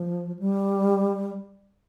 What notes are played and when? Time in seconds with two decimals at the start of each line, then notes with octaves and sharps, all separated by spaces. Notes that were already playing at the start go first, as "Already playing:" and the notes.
Already playing: F3
0.39 G3